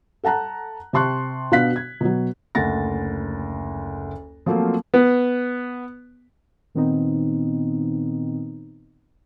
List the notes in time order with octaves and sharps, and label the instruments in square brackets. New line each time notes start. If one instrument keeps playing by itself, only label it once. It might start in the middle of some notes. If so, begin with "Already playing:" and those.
[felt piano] A4 F#5 A5 A#5 F#6
C3 G4 A5 C6 C#6 F#6
B2 B3 D4 F5 F#6 B6
G#6
B2 F#3
F#1 D2 F#5 A6 A#6
F3 F#3 A3 A#3 C4 F4
[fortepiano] B3
[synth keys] A#2 D#3 B3 C4 D#4